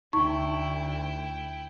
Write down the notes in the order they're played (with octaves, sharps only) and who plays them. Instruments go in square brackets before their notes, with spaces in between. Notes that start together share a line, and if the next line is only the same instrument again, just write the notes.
[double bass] D2 [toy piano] D#4 [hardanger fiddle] E4 G5 [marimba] C#6